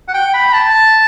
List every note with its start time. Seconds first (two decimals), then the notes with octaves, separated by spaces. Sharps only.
0.08 F#5
0.14 G5
0.34 B5
0.53 A5